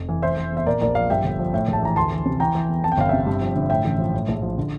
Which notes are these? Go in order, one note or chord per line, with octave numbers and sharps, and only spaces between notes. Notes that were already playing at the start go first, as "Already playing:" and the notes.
Already playing: F1
E3
E3 C5 E5
E3
E2
E5
A#2 A#4 D5
A#1 A#4 D5
F3 D5 F5
G2 E5 G5
G1
F3
A2 E5 G5
A#1
A5
E3 A#5
D2 A5 C6
E3
C3
E3 G5 A#5
E3
E2
F2 A5
G5
G1 F5
C3 E5 G5
G2
F3
D3
A2 E5 G5
A1
F3
A2
A#1
F3
D3